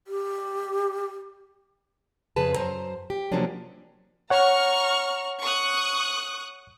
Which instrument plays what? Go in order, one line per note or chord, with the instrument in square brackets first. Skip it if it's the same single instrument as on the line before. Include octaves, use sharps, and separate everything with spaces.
[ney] G4
[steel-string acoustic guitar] F2 C#3 G#4 B4 A5
F#2 D#3 C5 A#5
G4
C3 F3 F#3 A#3 C#4 D4
[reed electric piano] C#5 F#5 [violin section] A#5 C#6 F6
[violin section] C#6 D#6 F#6